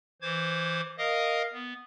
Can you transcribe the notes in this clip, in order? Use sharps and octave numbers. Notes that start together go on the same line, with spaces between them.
E3 C5 D6 G#6
A#4 D#5 F5 D#6
B3